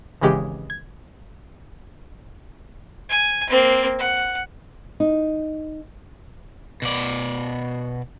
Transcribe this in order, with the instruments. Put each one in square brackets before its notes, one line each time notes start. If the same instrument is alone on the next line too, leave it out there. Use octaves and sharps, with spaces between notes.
[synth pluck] G#1 C#3 E3 G#3 G4
G#6
[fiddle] G#5
A#3 C4
F#5
[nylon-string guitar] D#4
[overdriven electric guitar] B2 D5